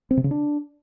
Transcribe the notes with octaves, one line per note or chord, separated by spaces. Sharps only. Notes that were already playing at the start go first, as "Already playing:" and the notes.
C4
C3
C#3
D4